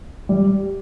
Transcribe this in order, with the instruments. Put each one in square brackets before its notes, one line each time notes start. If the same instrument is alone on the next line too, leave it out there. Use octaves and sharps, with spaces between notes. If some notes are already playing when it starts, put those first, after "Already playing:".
[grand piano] G3